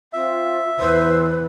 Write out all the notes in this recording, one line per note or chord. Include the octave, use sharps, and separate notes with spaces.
C4 F4 E5
E2 E3 B4 C5 E6